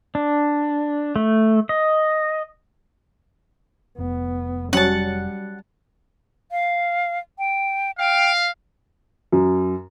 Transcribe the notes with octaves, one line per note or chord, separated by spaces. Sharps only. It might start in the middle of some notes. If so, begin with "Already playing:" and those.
D4
A3
D#5
F1 B3
F#3 G3 C#4 F#5 A5
F5
G5
F5 G5
F#2